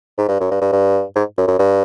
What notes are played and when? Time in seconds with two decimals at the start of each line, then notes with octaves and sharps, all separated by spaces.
0.18 G#2
0.28 G2
0.40 F#2
0.51 G2
0.61 G2
0.72 G2
1.15 G#2
1.38 F#2
1.48 F#2
1.59 G2